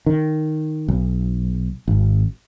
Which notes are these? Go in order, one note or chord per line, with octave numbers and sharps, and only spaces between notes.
D#3
B1
G#1